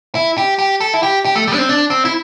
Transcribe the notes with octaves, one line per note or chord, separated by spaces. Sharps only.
E4
G4
G4
A4
E4
G4
G4
A3
G3
D4
C4
D4
C4
E4